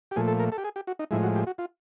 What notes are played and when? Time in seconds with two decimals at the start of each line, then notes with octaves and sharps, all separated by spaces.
0.11 G4
0.16 A#2 F3 A3 G#4
0.28 A4
0.39 A#4
0.52 A4
0.58 G4
0.64 G#4
0.76 G4
0.87 F#4
0.99 D#4
1.11 A2 F3 G#3 E4
1.23 F#4
1.36 G4
1.47 F#4
1.58 F4